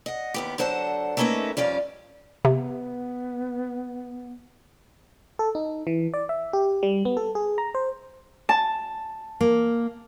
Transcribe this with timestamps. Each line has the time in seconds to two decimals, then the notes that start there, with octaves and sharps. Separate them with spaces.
0.06 D#5 F#5
0.34 D#2 B3 G4
0.58 D3 F#3 C5 F#5 A5
1.17 A3 A#3 C#4 D#4 B4 E5
1.57 F2 G3 C#4 D5 F5
2.45 C3 B3
5.39 A4
5.55 D#4
5.87 E3
6.14 D5
6.29 E5
6.53 G4
6.83 G3
7.05 B3
7.17 A4
7.35 G#4
7.58 A#5
7.75 C5
8.49 A5
9.41 A#3